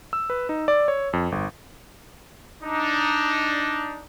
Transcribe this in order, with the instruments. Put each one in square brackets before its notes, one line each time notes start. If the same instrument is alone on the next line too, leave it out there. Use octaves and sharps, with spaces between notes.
[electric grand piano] E6
B4
D#4
D5
C#5
F2
G1
[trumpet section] D4 D#4